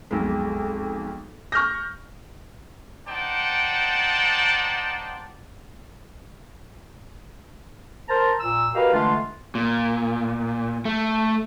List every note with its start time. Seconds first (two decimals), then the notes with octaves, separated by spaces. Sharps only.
0.11 B1 F2 G#3
1.52 C#6 F6 G6 A#6
3.08 D#4 C5 D5 F#5 G5 A5
8.08 A#4 C5 A5 A#5
8.39 A#2 E6
8.74 F#4 G4 A#4 B4 D#5 F5
8.93 D3 E3 G#3 A3 D4 F4
9.55 A#2
10.85 A3